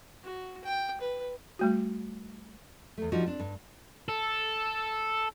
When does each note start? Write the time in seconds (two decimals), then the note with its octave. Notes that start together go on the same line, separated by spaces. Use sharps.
0.24 F#4
0.64 G5
1.01 B4
1.59 G3 A3 F#4
2.98 E2 A3
3.12 F3 G3 D4 D#4 F#4
3.26 C4 D4
3.39 G2
4.09 A4